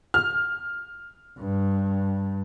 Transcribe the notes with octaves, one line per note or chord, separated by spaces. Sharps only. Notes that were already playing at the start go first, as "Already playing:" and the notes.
F6
G2